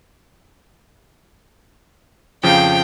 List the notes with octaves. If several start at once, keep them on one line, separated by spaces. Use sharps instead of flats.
F2 C#3 F3 F5 G5